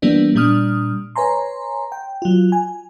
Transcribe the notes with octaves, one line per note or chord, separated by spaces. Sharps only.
E3 G3 A#3 B3 D4
A#2 G3 D4 D#6 F6
B4 C#5 G#5 A#5 C6
G5
F#3 F4
G#5